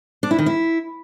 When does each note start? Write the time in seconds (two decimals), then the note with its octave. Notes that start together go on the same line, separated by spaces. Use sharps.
0.23 D4
0.31 E4
0.39 D#3
0.46 E4